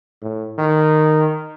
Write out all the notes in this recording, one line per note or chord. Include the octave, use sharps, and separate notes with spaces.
A2
D#3